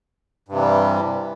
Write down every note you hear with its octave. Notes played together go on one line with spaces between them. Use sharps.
G2 C3 E3 G3